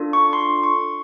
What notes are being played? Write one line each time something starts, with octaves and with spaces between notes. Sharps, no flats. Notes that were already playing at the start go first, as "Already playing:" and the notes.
Already playing: D4 F4 A4
C#6
C6
C#6